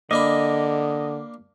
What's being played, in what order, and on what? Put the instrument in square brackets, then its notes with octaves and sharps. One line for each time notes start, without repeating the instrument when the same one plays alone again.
[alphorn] D3 [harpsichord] A#3 D4 B5 [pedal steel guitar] D#5